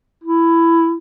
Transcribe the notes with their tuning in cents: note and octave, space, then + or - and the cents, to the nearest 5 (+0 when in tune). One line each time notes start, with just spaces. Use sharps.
E4 +10